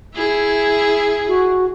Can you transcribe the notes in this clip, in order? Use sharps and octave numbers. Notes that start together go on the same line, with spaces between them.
E4 G#4
F#4